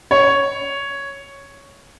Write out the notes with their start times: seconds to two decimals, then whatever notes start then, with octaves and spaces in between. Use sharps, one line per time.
0.11 C#5